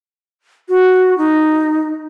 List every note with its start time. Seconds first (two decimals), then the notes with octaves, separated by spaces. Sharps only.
0.69 F#4
1.18 D#4